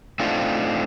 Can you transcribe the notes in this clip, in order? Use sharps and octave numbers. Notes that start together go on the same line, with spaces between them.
A3 C4 D4 D#4 F4